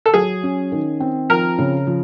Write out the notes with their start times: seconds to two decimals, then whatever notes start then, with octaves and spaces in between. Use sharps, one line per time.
0.06 A4
0.14 F#3 G#4
0.43 C#4
0.72 D#3
1.00 C4
1.30 F3 A#4
1.58 C#3
1.87 F3